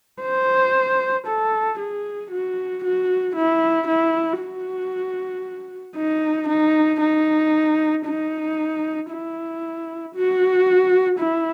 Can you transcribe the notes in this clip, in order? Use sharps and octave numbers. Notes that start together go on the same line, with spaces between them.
C5
A4
G#4
F#4
F#4
E4
E4
F#4
D#4
D#4
D#4
D#4
E4
F#4
E4